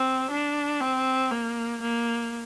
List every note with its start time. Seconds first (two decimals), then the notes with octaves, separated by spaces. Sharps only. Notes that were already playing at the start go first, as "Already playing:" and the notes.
Already playing: C4
0.31 D4
0.81 C4
1.31 A#3
1.82 A#3